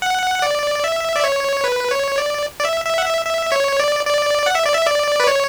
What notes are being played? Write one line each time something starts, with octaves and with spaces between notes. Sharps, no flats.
F#5
D5
E5
D5
C#5
B4
C#5
D5
D5
E5
E5
F#5
E5
E5
C#5
D5
D5
F#5
E5
D5
E5
D5
B4
C#5